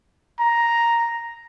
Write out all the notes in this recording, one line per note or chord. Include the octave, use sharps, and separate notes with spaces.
A#5